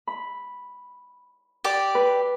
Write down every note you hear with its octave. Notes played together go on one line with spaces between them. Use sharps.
B5
G4 D5 D6
B4